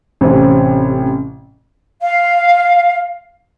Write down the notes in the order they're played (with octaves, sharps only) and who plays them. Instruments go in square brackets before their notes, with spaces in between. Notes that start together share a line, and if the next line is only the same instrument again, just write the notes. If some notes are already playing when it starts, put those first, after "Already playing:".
[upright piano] A1 C3 C4 C#4
[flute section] F5